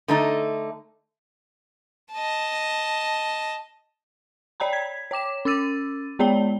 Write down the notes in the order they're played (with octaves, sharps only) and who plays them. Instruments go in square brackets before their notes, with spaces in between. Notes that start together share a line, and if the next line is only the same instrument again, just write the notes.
[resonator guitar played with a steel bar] D3 A3 D#4
[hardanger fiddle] D#5 A5
[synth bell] C#5 D5 G5 A#5 B5
G#6 B6
C#5 G5 D6 E7
C#4 D6 E6 A6 D#7
G#3 B3 C#5 D5 G5 G7